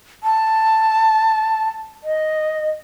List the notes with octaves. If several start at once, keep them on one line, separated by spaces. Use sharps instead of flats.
A5
D#5